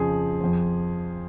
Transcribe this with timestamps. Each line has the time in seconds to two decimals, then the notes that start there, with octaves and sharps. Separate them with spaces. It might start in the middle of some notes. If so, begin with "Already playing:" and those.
Already playing: F2 C#3 F3 G#4
0.41 F2 F3